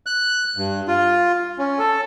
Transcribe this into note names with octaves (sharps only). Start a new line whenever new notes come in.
F#6
G2
F4
C#4
A4